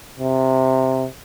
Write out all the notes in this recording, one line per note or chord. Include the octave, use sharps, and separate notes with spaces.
C3